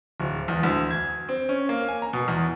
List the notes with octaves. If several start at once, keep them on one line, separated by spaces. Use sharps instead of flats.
D1
E2
D2
G#6
C4
C#4
A#3
G#5
A#5
B2
E2